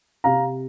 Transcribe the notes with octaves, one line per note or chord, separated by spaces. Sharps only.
C3 F5 A#5